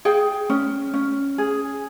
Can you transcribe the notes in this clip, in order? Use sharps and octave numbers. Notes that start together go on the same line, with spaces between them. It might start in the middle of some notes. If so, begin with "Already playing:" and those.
G#4 G5
C#4
C#4
G#4